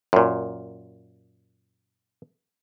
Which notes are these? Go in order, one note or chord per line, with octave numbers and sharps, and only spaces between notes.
F#2 A#2